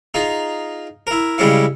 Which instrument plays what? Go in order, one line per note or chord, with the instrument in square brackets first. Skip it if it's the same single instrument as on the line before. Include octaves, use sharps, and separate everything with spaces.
[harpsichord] D#4 F4 G#4
E4 A#4
C#3 G3 G#3 C#4 E4 F5